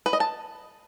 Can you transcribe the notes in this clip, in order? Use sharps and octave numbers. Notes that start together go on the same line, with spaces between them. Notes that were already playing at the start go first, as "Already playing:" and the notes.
B4
D#5
A5